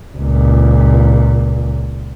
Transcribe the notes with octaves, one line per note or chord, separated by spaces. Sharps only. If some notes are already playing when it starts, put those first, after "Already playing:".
C#2 A#2